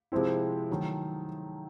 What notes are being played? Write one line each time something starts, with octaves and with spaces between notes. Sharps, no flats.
C3 F3 G#3 C4 E4
D#3 F#3 A3